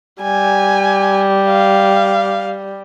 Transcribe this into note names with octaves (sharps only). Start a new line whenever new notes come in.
G3 G#5
F5